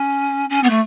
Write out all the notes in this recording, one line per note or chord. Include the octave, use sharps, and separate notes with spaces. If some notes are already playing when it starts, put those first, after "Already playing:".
Already playing: C#4
C#4
B3
A3